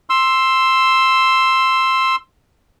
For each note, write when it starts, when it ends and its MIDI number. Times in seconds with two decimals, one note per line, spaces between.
0.10 2.16 84
0.10 2.16 88